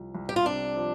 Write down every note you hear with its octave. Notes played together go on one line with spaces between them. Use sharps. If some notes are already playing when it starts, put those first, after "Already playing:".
Already playing: C2 F3
C2
G4
F4
C3 D4
F3